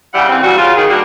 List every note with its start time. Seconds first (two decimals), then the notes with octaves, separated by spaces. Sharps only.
0.14 C#3 G3 E4 F#5
0.28 C#3 E3 C4
0.43 C#3 E3 F#3 G3 F#4
0.57 C#3 F4
0.76 D#3 G#4
0.89 G2 G3 A#3 F#4